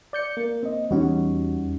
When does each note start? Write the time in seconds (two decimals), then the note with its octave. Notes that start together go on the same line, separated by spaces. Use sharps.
0.13 D5 G6 C#7
0.37 A#3
0.63 C4 D#5
0.91 E2 G3 C#4 D#4 F#4